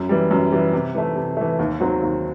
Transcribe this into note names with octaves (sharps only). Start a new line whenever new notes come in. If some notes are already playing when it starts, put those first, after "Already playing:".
Already playing: F#2
E3 G3
F#2
E3 G3
C3
E3 A3
C3
E3 A3
D#2
D#3 F#3 C4 F#4
D#2